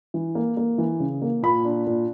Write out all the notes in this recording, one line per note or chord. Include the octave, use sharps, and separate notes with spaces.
E3
A#3
A#3
E3
C#3
A#3
A#2 B5
D4
A#2